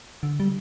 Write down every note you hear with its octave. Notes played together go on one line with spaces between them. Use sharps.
D3
G3